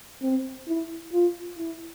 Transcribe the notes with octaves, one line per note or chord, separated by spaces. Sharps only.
C4
E4
F4
E4